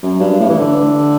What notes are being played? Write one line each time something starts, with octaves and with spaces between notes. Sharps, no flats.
F#2
G2
A2
E3
D3